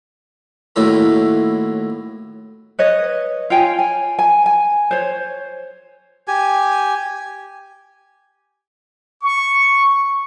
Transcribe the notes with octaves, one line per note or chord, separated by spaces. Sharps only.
D#2 A2 F#3 E4 F4
B4 C#5 D#5
F4 C#5 G5 G#5
G#5
G#5
G#5
C5 C#5
G4 G#5
C#6